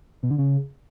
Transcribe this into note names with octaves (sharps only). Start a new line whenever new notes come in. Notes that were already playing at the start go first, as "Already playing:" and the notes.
B2
D3
C#3